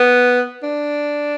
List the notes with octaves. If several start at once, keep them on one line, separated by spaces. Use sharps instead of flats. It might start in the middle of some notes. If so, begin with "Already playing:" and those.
Already playing: B3
D4